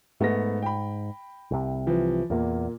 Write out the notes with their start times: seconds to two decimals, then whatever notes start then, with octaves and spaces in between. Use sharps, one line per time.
0.20 G#2 A3 B3 A#6
0.62 G5 B5
1.51 C2 C3
1.87 E3 F3
2.30 E2 A#2 A#3